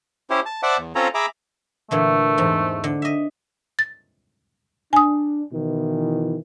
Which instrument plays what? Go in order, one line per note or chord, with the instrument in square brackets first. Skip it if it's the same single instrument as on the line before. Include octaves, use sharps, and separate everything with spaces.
[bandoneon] C#4 E4 G4 C5
A5
C5 D5 E5 F#5 A5 D6
E2
C4 C#4 F4 A4 C#5 A#5
G#4 E5 A#5 B5 D6
[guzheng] A#2 D3 E3 [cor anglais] A3
[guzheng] E2 G#2 C4
D3
D#5 E5
[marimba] A6
[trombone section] D4 [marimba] G#5 D#6
[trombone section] B2 D#3 E3